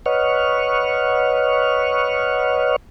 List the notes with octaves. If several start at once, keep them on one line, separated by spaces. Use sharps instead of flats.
B4 C#5 D#5 F#5 C#6 F6